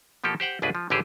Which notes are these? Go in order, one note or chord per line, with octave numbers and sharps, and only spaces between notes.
B2 F3 A#3 G4 A4
G4 C5 F#5 G5
G1 C#2 B2 D4 G#4 B4
F3
A1 D3 E3 G4 G#4 C5